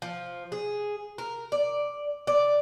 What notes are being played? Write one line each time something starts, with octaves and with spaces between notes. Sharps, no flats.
F3
G#4
A#4
D5
D5